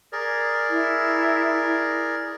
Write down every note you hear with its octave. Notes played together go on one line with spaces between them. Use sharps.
G#4 A#4 D5
E4